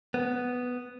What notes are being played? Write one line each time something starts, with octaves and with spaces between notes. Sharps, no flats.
B3